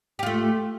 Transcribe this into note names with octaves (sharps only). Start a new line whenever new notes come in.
A3 F4 G4